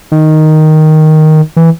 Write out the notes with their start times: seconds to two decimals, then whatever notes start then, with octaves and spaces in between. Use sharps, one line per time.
0.12 D#3
1.57 E3